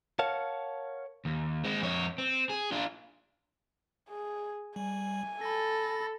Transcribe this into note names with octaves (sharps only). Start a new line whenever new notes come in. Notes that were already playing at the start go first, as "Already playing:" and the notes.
A#4 C#5 F5 F#5 A5
D#2
G#3 C4
F2 C#5
C4
G#4
D4 F4
G#4
G3 G#5
A4 B5 A6 A#6